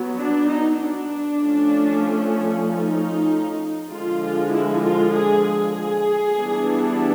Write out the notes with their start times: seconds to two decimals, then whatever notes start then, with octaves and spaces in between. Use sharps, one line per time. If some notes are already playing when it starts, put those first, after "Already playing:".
Already playing: F#3 B3
0.18 D4
0.50 D#4
0.81 D4
1.42 F3 A3 C#4
2.66 D#4
3.91 D3 F3 G#3 F4
4.52 E4
4.84 F4
5.14 G#4
5.45 G#4
5.76 G#4
6.38 E3 G3 B3 D4